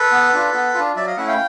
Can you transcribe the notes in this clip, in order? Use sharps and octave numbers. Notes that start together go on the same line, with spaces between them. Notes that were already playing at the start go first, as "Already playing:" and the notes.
Already playing: A4 B4
B3
D4 F4
B3
D4 F4
F#3 D5 E5
D#5 F5
A3 C#4 E4 E5 F#5
F5 G5